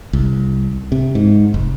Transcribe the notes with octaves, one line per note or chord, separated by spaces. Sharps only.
C2
C3
G#2
F1